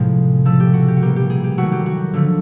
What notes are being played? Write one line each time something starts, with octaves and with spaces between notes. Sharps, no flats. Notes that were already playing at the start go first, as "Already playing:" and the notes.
Already playing: A2 C3 F3 G#3 G#4
C#3 F3 A3 A4
G4
F#4
G4
F#4
B2 G3 A#3 G4
G4
G#4
G4
D#3 F#3 A3 F#4
G4
F#4
D3 F3 A3